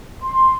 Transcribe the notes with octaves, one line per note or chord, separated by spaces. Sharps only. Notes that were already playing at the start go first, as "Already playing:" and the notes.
C6